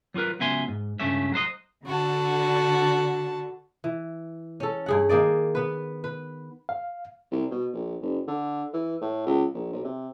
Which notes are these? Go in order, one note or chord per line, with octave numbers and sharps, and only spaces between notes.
F#3 F4 F#4 A#4 B4
C#2 F#3 B3 E5 G#5 C6
G#2
C#2 G2 A3 C#4 E5
F#3 F#4 C5 D#5
D3 F#4 A5
E3
C#4 A4
G2 G#4 F#5
D#3 A#3 G#4 D5
B3 B4
B4
F5
C2
B2
A#1
F#1
D3
E3
A2
C#2
A#1
B1
C3